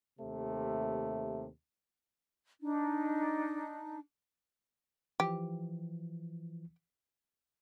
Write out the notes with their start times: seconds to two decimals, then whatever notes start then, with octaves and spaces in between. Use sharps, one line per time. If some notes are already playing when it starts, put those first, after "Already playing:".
0.19 D#2 C3 A3
2.61 D4 D#4
5.20 E3 F3 G4